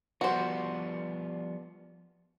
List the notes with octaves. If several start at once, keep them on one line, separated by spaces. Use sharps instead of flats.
F3 G3 B3 F#4 C5